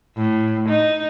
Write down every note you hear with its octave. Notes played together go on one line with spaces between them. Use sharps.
A2
D#4